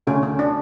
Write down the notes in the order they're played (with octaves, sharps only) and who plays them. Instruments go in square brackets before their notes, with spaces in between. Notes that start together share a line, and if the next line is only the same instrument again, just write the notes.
[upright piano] D2 [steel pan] C#4
[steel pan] C#4
D4